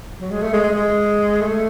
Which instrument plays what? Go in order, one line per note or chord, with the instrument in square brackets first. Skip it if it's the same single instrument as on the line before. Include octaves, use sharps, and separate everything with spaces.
[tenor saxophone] F#3
G#3
A3
G#3
G#3
G#3
A3